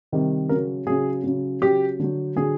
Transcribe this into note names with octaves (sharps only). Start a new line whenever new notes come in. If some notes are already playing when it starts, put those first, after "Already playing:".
C3 D#3 G3
C#3 F#3 A#4
C#3 F#3 G#4
C#3 F#3
C#3 F#3 G4
D3 F#3
D3 F#3 G#4